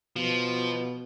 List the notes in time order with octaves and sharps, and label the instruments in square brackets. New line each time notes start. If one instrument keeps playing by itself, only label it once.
[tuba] B2 [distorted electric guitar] F3